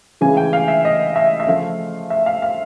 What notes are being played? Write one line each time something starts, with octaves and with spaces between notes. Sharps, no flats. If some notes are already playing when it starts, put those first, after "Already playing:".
C#3 E3 G#3 C#4 G#5
G5
F5
E5
D#5
E5
E5
C#3 F3 A3 F5
E5
F5
F5